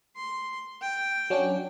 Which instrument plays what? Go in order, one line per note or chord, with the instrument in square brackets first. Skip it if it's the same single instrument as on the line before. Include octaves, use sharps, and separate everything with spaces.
[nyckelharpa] C6
G5
[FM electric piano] F#3 C#4 D4